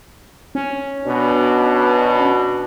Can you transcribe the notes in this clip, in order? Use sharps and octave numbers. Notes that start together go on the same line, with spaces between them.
C#4
B2 D4